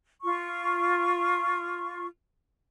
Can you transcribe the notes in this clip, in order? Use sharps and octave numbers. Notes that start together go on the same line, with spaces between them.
F4 C#6